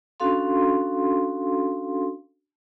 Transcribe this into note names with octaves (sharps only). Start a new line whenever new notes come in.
C#4 D4 F#4 A4 F5 C6